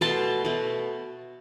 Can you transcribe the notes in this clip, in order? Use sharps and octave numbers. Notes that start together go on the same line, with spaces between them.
B2 A3 A5 C6
B2 A3